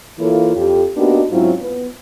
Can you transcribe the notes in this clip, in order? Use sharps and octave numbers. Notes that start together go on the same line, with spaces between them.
E3 A#3 E4 F4 A4 C#5
F2 G4 A4
A#3 B3 D4 D#4 F#4 G4
G#2 F#3 C4 C#4 E4 F4
B3